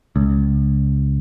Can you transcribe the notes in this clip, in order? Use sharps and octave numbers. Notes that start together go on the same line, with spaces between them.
C#2